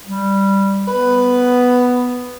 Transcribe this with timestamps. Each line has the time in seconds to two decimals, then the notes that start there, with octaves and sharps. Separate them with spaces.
0.05 G3
0.87 B3 B4